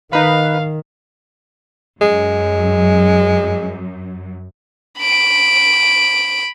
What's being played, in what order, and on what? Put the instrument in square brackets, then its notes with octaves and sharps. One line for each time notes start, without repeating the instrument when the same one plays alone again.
[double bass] D#3 [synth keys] D#4 B4 [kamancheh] F5
[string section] F#2 [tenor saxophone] G#3
[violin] B5 D7